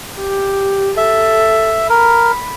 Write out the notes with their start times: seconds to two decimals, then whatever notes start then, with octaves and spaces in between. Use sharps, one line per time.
0.18 G4
0.97 A4 E5
1.90 A#4 B5